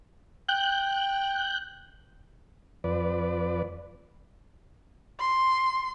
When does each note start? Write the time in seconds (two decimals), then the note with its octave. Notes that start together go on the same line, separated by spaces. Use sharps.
0.49 G5 F#6 G6
2.84 F2 B4 D5
5.19 C6